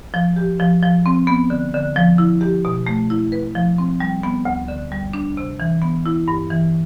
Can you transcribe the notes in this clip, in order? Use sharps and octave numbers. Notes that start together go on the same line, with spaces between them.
F3
G4
F3
F3
C4
B3
D3
D3
F3
E4
G4
B2
A3
E4
B4
F3
C4
G3
B3
D2
D3
G3
D4
C3
E3
B3
E4
G2
E3